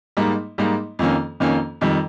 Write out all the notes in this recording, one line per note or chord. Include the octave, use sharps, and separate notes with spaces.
G#2 G3 A#3 D#4
G#2 G3 A#3 D#4
F2 D#3 A#3 C#4
F2 D#3 A#3 C#4
F2 D#3 G3